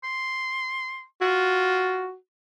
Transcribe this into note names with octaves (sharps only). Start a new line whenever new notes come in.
C6
F4 F#4